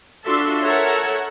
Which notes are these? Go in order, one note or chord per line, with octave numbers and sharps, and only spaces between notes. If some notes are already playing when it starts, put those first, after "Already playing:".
D4 F4 F#4 A4 E5 C6
A4 A#4 C#5 E5 F#5 A#5